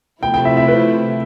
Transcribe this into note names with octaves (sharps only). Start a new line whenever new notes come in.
C3 F3 A3 E4 G5
G5
E5
E5
B4